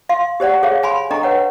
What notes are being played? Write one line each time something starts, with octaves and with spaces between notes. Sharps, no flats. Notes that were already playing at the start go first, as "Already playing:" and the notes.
F5 C6
G4 C5 D5 F#5
G#4 A4 C5 C#5 F5
F5 G#5 B5 C6
D4 A4 D#5 G5 A#5 C#6
B4 C#5 F#5